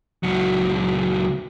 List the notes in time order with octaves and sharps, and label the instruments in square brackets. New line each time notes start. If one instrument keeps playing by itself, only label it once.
[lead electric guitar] C#2 F#3